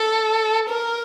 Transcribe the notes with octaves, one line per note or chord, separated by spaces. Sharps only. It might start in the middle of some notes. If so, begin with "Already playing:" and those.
Already playing: A4
A#4